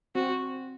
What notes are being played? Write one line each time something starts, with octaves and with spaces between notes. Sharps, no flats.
C4 F#4